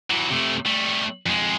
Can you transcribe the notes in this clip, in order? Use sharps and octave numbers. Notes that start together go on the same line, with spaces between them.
E3 F#3
C3 A3
G3 A3
F2 G#3